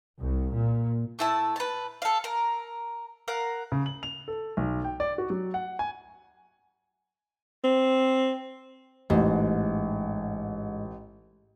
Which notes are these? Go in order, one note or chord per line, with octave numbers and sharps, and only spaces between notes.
C2
A#2
A3 E4 A5
B4 A5
A4 F5
A#4
A#4 F5 F#5
C#3
F#7
F7
A4
B1
G5
D5
F#4
F#3
F#5
G#5
C4
A1 G#2